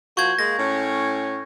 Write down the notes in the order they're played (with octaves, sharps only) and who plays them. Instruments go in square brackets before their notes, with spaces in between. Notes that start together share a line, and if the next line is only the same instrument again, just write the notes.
[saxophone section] F3 A#3 F#4 [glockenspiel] C#6 G6 G#6
[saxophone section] G#3 A#3 [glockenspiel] A#6
[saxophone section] A2 C#4